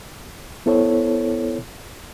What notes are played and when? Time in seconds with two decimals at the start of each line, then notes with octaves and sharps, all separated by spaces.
0.66 B3 E4 A4 C5 C#5